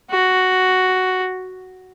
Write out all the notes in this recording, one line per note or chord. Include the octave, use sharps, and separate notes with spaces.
F#4